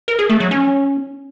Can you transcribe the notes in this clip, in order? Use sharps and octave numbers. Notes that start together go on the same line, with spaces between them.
A#4
G#4
A3
F#3
C#4